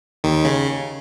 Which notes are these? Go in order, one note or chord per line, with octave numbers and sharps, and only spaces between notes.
D#2 D#3
C#3